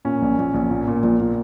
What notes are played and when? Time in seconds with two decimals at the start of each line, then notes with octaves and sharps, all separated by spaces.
0.05 A#2 C#4
0.22 A#1
0.38 A#1
0.54 A#1
0.70 A#2
0.88 A#2
1.03 A#1
1.20 A#2